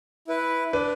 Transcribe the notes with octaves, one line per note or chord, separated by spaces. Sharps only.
E4 B4
D4 B4